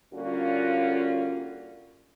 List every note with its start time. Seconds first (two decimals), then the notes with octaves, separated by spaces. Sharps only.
0.13 D3 G3 A#3 C#4 F4 F#4